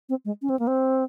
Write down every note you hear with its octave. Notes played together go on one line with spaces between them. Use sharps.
C4
G#3
C#4
C4
A#3
C4